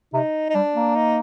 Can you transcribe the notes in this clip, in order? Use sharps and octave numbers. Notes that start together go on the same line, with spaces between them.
C3 D#4
D#4
G3 D4
A#3
D#4